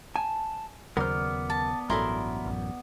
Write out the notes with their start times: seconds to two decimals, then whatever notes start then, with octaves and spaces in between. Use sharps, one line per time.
0.16 G#5 A5
0.97 D#2 C#3 F#3 B3 A#4 C5 D5 F6
1.50 A5
1.90 A1 G2 F#3 E4 A4 A#4 C6
2.46 A1 F#2